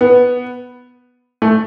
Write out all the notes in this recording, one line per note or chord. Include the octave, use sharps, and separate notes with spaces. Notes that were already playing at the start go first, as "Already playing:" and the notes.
B3
A3